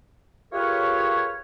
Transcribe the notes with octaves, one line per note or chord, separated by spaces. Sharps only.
F4 G4 G#4 A#4 B4 C#5